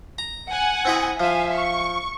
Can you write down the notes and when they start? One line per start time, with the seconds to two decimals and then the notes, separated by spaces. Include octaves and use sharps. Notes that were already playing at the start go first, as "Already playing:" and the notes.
0.18 A#5
0.50 F#5 G#5
0.85 C4 E4 D#5
1.20 F3 E5 F5 G#5
1.54 C#6